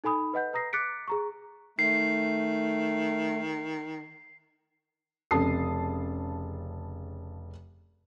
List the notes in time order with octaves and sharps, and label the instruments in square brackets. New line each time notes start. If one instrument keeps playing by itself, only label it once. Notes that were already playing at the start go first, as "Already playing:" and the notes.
[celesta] D#4 A4 G#5 B5 D#6
B4 D#5 F#5 G6
B4 A#5 D#6 A#6 C7
D6 F#6 A6 B6 C#7 D7
G#4 A#5 C#6
[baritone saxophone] D#3 [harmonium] A3 [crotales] C7
[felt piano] F1 C#3 A5 D#6 C7